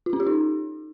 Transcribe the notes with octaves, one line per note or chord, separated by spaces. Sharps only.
F4
C#4
G4
D#4